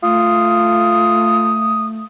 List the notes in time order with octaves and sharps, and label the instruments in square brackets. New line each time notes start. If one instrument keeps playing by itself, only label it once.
[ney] A3 [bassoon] F4 [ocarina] D#6